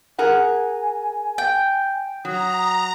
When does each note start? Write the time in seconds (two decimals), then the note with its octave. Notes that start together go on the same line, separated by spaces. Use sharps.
0.18 G#4 A#4 F#5 G#5
1.38 G5
2.25 F#3 A#5 D#6